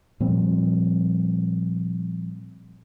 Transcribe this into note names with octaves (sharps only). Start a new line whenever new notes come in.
A#2 F3 G3 C4